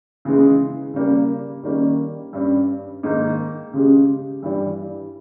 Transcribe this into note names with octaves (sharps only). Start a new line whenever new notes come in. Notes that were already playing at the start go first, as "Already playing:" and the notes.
C#3 E3 G#3
C#3 G3 A#3
D#3 G3 A#3 C#4
G2 G3 C#4
G#2 D#3 A#3 D#4
C#3 G#3 C#4 G4
G2 E3 G3